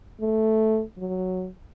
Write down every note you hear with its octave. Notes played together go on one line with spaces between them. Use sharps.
A3
F#3